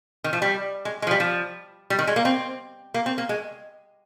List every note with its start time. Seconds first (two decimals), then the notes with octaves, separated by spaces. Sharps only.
0.24 D#3
0.33 F3
0.42 G3
0.85 G#3
1.02 G#3
1.07 F3
1.11 G3
1.20 F3
1.90 G3
1.99 D#3
2.07 G#3
2.16 A#3
2.25 C4
2.94 A#3
3.06 C4
3.18 A#3
3.29 G#3